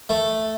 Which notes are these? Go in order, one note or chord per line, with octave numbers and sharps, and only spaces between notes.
A3